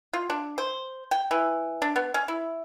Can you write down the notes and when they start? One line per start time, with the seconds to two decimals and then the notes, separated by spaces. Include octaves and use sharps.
0.13 F4
0.30 D4
0.58 C5
1.11 G5
1.31 E3
1.82 D4
1.96 B3
2.14 C#4
2.28 E4